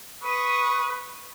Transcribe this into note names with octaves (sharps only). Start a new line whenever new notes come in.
B4 C#6 D#6